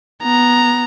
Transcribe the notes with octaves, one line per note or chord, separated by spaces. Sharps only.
B3 A#5